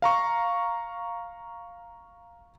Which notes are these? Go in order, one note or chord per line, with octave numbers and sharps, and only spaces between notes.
F5 A#5 C#6